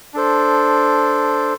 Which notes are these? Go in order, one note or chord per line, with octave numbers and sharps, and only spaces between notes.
D4 A4 C5